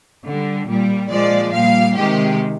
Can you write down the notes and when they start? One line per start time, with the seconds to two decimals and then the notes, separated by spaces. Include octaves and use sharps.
0.24 D3 G3
0.68 A#2 G3
1.10 A#2 F3 G#3 D5
1.53 A#2 G3 F5
1.96 C3 D#3 G#3 G4